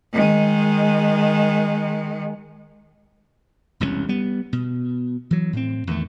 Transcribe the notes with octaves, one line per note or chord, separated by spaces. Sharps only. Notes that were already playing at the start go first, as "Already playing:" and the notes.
D#3 G#3
E1 C2 D3 C#4
G3 B3
B2
E3 F#3
A2 C4
E2 D#3 A3